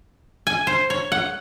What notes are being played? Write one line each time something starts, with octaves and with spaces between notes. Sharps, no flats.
G#5
C5
C#5
F#5